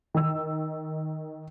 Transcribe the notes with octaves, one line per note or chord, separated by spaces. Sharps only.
D#3 E6